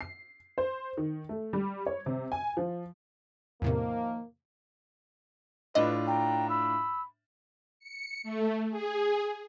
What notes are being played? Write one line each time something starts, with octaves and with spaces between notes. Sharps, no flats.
C7
C5
D#3
A3
G3
C#5
C3
G#5
F3
E2 A2 C3 D#3 F3 A#3
A2 D4 F4 B4 D#5
G5 A#5
B5 E6
C#7
A3
G#4